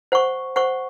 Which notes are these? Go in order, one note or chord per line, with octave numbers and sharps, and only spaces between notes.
C5 F#5 C#6
C5 F#5 C#6